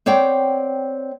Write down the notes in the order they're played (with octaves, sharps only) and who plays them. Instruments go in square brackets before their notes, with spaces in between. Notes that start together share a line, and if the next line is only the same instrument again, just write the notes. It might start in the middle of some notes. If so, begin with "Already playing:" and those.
[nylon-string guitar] C4 C#5 D5 F#5 G5